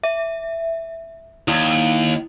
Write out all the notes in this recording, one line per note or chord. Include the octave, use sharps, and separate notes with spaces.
E5
D#2 E4